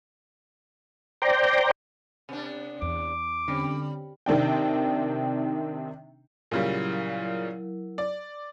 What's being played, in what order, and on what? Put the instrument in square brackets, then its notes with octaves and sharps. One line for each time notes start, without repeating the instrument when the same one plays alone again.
[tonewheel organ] C5 D5 G5 A#5
[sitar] C3 B3 D4
[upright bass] E2 [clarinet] D6
[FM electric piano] D3 C4 C#4 [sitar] G3
[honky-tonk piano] C3 D#3 C4 D4 G5
[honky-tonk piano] A#2 C#3 G3 [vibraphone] F#3 E4 A#4
[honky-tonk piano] D5